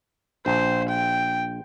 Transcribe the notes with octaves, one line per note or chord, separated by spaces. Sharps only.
A#1 C5
G5